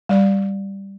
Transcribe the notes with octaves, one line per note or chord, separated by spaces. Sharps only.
G3 D5